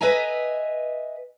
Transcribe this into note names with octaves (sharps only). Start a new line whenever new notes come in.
B4 D#5 E5 G#5 A#5